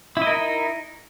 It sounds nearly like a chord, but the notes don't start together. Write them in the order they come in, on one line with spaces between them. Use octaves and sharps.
E4 D#5 A#4 D#4